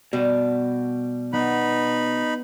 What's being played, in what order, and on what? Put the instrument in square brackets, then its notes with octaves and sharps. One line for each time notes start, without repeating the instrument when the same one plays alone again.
[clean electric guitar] B2 [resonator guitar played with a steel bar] G3
[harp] B3 [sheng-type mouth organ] D#4 B5